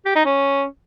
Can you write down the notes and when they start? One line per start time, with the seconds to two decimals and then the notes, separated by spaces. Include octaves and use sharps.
0.05 G4
0.15 D#4
0.25 C#4